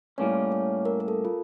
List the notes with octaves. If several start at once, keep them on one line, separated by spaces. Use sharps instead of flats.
A2 G3 A#3 C#4 C#5
C#5
A#4
A#4
A4
F4